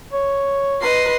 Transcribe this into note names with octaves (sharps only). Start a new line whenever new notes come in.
C#5
B4 D#5 C6